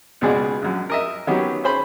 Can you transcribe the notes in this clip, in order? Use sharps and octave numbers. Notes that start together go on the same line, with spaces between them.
C#2 B2 G#3 G#4 D5 F#5
A#1 F#2
A#4 D#5 E5
D#3 F#3 B3 C#4 G4
C#4 G#4 C5 B5